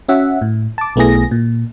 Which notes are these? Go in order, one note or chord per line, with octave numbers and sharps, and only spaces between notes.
C#4 F#4 E5 F#5
A2
A5 D6
B1 A3 B3 E4 G#4 A#6
A#2